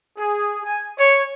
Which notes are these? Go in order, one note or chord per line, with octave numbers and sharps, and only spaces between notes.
G#4
G#5
C#5